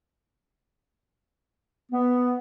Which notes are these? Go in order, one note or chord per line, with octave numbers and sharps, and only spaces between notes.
B3